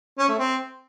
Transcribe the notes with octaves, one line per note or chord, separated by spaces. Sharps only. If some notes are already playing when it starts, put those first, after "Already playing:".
C#4
A3
C4